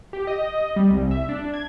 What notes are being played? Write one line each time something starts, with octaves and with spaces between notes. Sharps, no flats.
G4
D#5
G3
C2
E5
D4
G#6